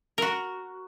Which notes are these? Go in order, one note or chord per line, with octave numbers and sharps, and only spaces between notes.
F#4 A#4